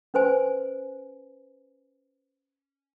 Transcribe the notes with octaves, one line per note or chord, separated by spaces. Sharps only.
C#4 B4 C5 G#5